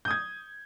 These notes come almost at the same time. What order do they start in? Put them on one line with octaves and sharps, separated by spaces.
G6 D#6 G#6